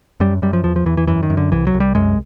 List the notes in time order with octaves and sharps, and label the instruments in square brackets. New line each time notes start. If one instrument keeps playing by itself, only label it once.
[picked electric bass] F#2 G3
F#2 G3
F3
E2 F3
F3
E2 E3
E3
F#2 E3
D#3
F#2
D3
C2 E3
F#3
C2
G3
F#2 G#3